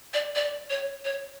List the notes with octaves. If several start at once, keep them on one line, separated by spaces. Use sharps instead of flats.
D5
D5
C#5
C#5